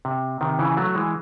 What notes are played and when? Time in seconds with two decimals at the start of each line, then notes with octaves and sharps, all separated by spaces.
0.05 C3
0.41 C3 D#3
0.59 C#3 E3
0.77 F#3 A3
0.95 E3 G#3